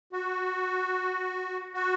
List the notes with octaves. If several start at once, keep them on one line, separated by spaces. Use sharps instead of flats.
F#4
F#4